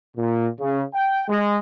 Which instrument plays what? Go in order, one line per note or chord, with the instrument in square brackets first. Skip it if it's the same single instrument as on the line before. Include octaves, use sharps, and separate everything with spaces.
[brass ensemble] A#2
C#3
G5
G#3